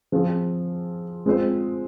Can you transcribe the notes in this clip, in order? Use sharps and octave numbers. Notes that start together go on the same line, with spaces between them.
F3 C4 F4 G#4
G#3 C4 F4 C5